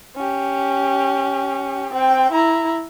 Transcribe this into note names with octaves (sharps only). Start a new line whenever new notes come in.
C#4 G4
C4 G5
E4 A#5